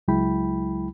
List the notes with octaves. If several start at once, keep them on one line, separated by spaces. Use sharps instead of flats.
C#2 F#3 G#3 E4 G5 B5